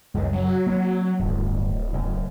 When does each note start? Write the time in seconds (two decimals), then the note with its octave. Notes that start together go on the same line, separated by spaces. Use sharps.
0.14 F#1 C#2 C#3
0.33 F#3
0.67 A#3 C4
1.19 D1 G1
1.93 F#1 F#2